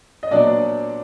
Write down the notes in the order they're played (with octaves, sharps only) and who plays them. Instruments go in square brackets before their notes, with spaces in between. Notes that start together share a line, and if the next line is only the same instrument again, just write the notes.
[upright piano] D#5
A#2 F#3 B3 D4 D5